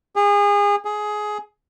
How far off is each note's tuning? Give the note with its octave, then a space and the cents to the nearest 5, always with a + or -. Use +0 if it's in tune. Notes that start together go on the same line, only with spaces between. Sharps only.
G#4 -30
G#4 +15